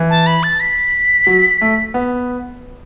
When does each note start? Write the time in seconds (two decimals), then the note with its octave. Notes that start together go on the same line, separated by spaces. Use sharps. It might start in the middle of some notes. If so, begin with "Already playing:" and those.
Already playing: E3
0.10 A5
0.27 B5
0.43 A6
0.60 B6
1.27 F#3
1.61 A3
1.94 B3